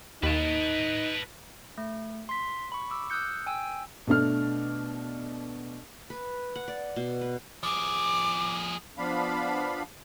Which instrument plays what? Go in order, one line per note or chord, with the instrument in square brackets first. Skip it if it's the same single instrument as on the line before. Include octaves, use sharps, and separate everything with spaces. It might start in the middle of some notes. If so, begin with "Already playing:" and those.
[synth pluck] D#2 [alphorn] D#4 [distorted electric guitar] B4 A5
[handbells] A3
C6 B6
B5 C#6
D6 E6
D#6 E6 F#6 G6 C#7
G5 G#5 E6
[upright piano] B2 A3 D4 F6
[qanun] B4
F#5
D5
B2
B4
[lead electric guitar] F3 G#4 [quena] D6
[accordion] F3 B3 D4 F5 B5